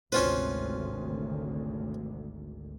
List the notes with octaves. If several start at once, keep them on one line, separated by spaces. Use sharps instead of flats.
G#1 D2 C3 C#4 F4 B4 C5